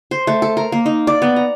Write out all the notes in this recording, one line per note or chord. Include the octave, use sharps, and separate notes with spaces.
C5
A3
A4
A#4
A#3
D#4
D5
B3
A#5